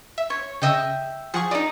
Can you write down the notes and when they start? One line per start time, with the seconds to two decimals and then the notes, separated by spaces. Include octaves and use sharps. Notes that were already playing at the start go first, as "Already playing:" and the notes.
0.18 E5
0.30 C#5
0.62 C#3 D#5 E5 G5
1.34 F3 G#4 F#5 C#6
1.51 D#4 D5 D#5 D#6